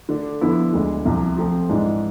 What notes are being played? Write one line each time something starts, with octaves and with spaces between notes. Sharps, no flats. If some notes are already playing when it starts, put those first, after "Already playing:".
D3 A3 D4
D3 F3 B3 E4
D2 D3 G#3
C2 C3 F3
F3 A3 C4
G#2 E3 G#3 D4